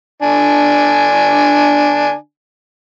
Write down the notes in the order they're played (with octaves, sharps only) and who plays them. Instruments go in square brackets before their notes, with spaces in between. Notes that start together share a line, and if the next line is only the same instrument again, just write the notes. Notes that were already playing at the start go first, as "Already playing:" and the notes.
[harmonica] D3 D4 G#5